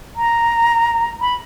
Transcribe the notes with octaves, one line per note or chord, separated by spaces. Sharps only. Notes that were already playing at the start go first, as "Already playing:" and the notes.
A#5
B5